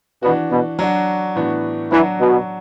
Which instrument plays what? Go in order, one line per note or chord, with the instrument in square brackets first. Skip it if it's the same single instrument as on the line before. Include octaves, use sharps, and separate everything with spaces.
[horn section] B2 [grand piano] E3 D4 F#4
[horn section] B2
[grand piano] F#3 D4 F#4
A2 E3 B3 D4 F#4
[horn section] E3 [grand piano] F#3 D4 F#4
[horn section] B2